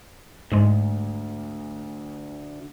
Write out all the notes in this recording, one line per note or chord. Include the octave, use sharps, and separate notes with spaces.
D2 G#2 G#3